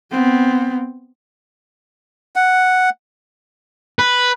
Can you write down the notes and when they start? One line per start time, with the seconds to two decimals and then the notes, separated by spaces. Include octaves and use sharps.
0.11 B3 C4
2.36 F#5
3.99 B4